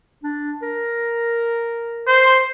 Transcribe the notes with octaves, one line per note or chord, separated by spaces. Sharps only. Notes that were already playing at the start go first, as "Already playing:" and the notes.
D4
A#4
C5